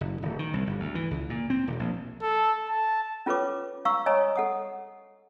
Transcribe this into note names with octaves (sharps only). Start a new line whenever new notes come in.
F#1
D1
D#3
C2
G1
D2
E3
C#2
A#2
C4
E1
A#1
A4
A5
C#4 F4 A4 B4 C#5 D6
F5 A#5 C#6 E6
C#5 D#5 G#5 A#5 D#6
A4 F#5 D#6